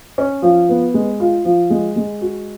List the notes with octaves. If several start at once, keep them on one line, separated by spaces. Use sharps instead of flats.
C#4
F3
B3
G#3
F4
F3
G#3
G#3
F#4